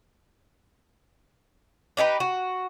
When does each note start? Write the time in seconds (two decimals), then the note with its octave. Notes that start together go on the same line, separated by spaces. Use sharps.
1.97 D4 D#4 G4 B4
2.20 F#4